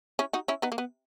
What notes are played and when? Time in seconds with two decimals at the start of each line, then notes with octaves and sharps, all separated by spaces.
0.19 C#4 E4
0.33 D#4 F#4
0.48 C#4 E4
0.62 B3 D#4
0.72 A#3
0.78 B3